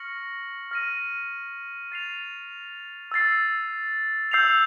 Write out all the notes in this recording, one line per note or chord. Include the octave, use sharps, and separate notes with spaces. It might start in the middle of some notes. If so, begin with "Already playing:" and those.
Already playing: C#6 F6 A#6 C#7 F#7
F6 A#6 D#7
A6 C7 F7
E6 A6 C7
E6 G6 C7 F7